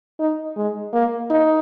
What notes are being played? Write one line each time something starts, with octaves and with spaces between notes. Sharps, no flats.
D#4
G#3
A#3
D#4